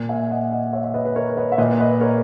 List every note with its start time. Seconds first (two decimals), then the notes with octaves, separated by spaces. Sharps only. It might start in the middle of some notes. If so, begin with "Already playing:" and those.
Already playing: A#2
0.09 E5 G#5
0.31 D#5 F#5
0.52 D#5 F#5
0.73 C#5 E5
0.84 E5
0.94 B4 D#5
1.05 B4
1.16 A#4 C#5
1.37 B4 D#5
1.52 E5
1.58 A#2 B4 D#5
1.80 B4 D#5
2.01 A#4 C#5